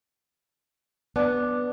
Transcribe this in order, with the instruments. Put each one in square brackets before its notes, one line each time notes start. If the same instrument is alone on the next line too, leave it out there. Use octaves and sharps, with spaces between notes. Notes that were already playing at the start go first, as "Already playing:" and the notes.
[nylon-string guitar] B3 [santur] D4